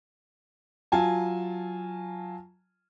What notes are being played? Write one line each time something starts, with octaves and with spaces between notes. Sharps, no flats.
F#3 F4 G#5 A5